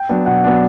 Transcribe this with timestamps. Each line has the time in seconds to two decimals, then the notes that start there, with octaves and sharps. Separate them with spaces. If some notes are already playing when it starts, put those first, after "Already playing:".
Already playing: G5
0.09 F#3 B3 D4
0.26 B2 F#5
0.44 F#3 B3 D4